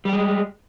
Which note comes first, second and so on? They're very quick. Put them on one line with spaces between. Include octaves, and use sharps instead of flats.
G3 G4 G#3